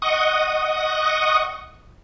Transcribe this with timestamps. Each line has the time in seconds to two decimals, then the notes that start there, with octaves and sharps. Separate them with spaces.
0.02 D#5 F#5 C#6 D#6